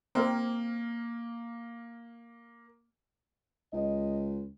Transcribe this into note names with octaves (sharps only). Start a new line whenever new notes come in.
A#3 C4 A#4
C#2 D#5